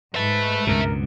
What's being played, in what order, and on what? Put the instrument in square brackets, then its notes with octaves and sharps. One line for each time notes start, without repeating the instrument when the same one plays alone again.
[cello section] G#2 [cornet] B4 [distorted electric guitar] E5 A5
[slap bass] C#2 G2 B2 [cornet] A#4